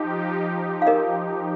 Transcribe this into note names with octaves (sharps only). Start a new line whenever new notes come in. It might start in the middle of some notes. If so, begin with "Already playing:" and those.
Already playing: F3 D#4 G4
F5
A#4 D#5